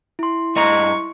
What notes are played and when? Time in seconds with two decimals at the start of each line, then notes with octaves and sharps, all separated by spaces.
0.19 E4 C6
0.56 G2 D#5 A#5 C#6